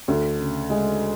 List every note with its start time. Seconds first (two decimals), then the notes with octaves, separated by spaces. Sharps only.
0.08 D2
0.39 C#3
0.70 G#3